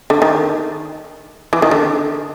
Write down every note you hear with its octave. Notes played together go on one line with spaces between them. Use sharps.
D3
D#3
E3
D#3
D3